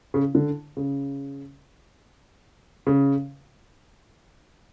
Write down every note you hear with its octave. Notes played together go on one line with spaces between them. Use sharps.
C#3
D3
C#3
C#3